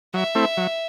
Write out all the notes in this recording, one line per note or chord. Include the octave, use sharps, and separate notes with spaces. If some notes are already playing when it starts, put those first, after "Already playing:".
F#3 E5
A3 C4 E4
F#3